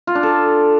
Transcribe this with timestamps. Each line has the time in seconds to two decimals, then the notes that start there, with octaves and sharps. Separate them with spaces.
0.07 F4
0.15 D4
0.23 A4